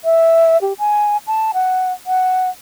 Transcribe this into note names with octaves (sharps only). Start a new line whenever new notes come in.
E5
G4
G#5
A5
F#5
F#5